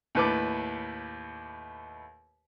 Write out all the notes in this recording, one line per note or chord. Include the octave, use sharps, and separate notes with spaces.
D#2 A2 B4 A5 D6